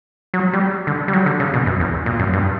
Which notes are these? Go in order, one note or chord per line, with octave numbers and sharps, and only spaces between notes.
F#3
G3
D3
G3
F#3
D3
C#3
B2
F#2
E2
A#2
F#2
G2